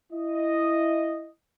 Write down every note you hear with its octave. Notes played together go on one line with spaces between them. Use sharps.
E4 D#5